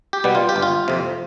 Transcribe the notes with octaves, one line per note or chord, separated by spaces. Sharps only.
G4
B2 G3 B3
F4
G4
G1
F4
F2 C3